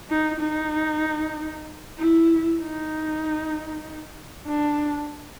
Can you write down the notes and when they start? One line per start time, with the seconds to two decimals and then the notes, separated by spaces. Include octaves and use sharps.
0.09 D#4
0.40 D#4
1.98 E4
2.60 D#4
4.47 D4